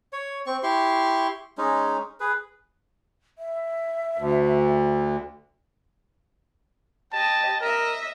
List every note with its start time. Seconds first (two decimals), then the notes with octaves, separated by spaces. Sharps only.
0.13 C#5
0.46 C4 C#6
0.63 E4 G4 C6 C#6
1.58 G#3 C#4 D#4
2.20 G#4 B4
3.38 E5
4.17 D2
7.13 G4 D#5 A5
7.61 A#4 D#5 E5